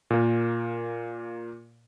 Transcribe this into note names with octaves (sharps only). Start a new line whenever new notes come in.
A#2 A#3